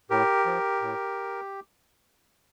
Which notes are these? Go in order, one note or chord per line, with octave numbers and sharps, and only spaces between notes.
A2 G4 A#4
F3
A2